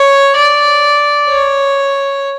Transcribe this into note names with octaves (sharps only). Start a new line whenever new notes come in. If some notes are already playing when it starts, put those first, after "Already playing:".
Already playing: C#5
D5
C#5